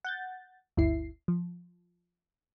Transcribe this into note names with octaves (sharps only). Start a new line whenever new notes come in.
F#5 G6 A6
G1 D2 G2 E4 C7
F3